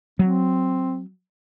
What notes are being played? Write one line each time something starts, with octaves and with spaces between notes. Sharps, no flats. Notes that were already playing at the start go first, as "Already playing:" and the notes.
F#3 C4